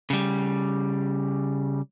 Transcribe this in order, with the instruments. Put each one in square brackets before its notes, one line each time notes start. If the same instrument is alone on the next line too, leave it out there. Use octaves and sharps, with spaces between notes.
[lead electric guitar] C#3 G3